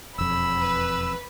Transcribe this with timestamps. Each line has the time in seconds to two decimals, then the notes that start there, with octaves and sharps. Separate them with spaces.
0.18 E1 F2 B5 E6
0.59 B4